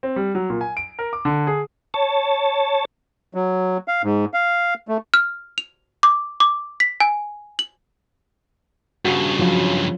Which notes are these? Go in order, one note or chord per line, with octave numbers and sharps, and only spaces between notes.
C4
G3
F#3
A#2
G#5
D7
A#4
D6
D3
G#4
C#5 A5
F#3
F5
G#2
F5
A3
F6
F7
D6
D6
B6
G#5
F#7
G2 C#3 F#4
F3 F#3 F4